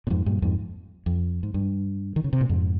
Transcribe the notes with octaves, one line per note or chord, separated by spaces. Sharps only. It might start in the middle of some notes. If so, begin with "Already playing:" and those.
A#2
F2 G#2
G2 A#2
F2 G#2
F2
G#2
G2
D#3
C#3
C3
A#2
F2 G#2